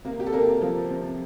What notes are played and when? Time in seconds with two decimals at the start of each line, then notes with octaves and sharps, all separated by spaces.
0.05 C3 A#3 A#4
0.20 G4
0.27 A4
0.33 C3 A#3 A#4
0.62 F3
0.89 C3